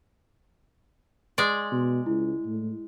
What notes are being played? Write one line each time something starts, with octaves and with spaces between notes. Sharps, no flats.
G#3 D5 C6
B2
C#2 E4
A2